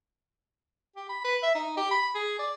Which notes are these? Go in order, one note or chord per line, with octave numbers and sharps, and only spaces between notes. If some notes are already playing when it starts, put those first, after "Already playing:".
G4
B5
B4
E5
D#4
G4
B5
G#4
D5